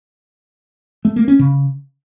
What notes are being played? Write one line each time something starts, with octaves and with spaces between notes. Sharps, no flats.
A3
A#3
C#4
C#3